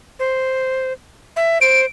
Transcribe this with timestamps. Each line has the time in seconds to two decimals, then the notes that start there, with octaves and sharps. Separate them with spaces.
0.19 C5
1.36 E5
1.61 C5 D7